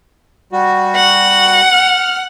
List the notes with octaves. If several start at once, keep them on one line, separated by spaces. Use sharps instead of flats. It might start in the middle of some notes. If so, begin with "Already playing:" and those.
G3 F#4
F#5
F6